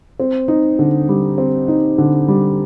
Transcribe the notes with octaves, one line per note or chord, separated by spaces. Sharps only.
C4
D#4
D3
G3
C4
D#4
D3
G3